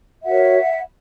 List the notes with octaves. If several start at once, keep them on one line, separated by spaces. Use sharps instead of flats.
F#4 A#4 C#5 E5 F#5